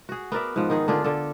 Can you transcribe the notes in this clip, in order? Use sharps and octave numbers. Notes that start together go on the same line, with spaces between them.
F#4 G#4
B3 A#4 D5 E5
G#2 F3
D#3 D#4 G#4
D3 D4 F4 G#4
D3 A4